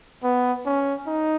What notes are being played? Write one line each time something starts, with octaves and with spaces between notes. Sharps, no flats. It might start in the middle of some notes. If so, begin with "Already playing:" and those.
B3
C#4
D#4